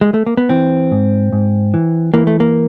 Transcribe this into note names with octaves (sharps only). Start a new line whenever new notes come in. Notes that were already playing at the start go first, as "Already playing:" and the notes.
G#3
A3
A#3
B3
E3 C4
G#2
G#2
E3
E3 A#3
A3
A#3